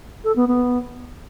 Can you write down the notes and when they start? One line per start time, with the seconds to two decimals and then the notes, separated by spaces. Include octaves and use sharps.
0.24 A4
0.36 B3
0.48 B3